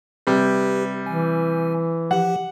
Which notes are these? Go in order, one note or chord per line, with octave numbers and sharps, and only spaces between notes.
C3 G3 G4 B4
E3 G#5
F3 G4 F#5